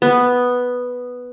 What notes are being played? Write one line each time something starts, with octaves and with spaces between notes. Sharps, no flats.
B3